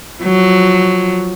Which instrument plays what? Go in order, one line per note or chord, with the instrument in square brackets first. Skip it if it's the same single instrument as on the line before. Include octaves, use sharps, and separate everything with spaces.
[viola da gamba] F3 F#3